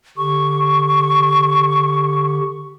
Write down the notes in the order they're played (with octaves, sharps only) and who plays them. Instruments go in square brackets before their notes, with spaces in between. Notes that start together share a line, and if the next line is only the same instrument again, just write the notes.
[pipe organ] D3 G4 [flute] C#6